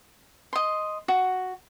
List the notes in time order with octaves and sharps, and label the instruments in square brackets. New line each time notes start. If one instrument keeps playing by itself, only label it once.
[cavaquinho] D#5 C6
F#4